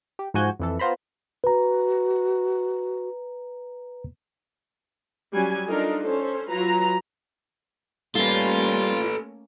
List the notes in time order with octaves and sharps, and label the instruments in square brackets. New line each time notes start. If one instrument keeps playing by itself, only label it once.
[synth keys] G4
G#2 F3 F#4 G#5 G6
F2 E3 A4
B3 F4 C5 A#5 B5
[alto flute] F#4 [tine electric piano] B4 A#5
[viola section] F#3 G3 C#4 G#5
D4 D#4 F4 A4 A#4 D#5
C#4 A4 C5
F#3 F4 B4 A#5
[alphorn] G3 [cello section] A3 A#3 C#4 [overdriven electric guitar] F4 [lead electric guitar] A4 B4